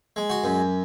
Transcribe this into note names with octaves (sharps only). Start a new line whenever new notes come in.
G#3
F#4
F#2